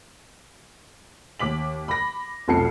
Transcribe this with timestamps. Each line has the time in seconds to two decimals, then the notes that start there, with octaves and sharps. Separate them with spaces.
1.39 D#2 D6 B6 F#7
1.88 B5 A#6
2.48 F1 B1 F2 A4 C7 C#7